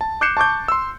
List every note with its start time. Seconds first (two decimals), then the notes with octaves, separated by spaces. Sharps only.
0.01 A5
0.21 D6 F#6 G6 C7 C#7 E7
0.37 A5 C#6 D6 G6
0.68 C6 E6